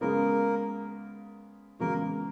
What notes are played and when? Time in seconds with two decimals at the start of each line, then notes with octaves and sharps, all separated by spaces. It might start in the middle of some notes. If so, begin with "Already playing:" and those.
0.01 C#3 G#3 A#3 B3 A#4
1.80 C#3 E3 G#3 A#3 B3 F#4 A#4